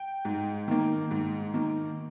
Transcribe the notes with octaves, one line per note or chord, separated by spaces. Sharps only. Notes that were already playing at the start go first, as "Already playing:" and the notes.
Already playing: G5
G#2
D#3 A#3
G#2
D#3 A#3